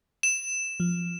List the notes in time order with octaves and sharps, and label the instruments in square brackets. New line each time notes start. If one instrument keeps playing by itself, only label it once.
[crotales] E7
[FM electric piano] F3